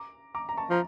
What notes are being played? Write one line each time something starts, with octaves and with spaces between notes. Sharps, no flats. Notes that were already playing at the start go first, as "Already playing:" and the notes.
Already playing: A#5 D6
A#5 D6
A#5
A5 C#6
F3 A#5